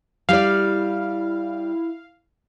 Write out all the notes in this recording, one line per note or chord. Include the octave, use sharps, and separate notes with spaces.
G3 E4 D5 F5